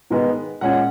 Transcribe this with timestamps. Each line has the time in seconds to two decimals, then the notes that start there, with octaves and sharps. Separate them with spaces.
0.10 G#2 D#3 G#3 B3
0.61 A#2 G#3 C#4 F#5